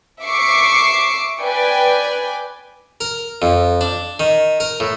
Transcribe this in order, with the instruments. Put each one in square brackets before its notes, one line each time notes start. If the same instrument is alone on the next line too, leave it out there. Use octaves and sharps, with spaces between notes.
[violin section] E5 C#6 D6 C7 C#7
B4 D5 G5 G#5
[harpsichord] A#4
F2
D4
D#3
A#4
A2